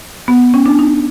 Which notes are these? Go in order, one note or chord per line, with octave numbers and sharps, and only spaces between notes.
B3
C#4
D4
D#4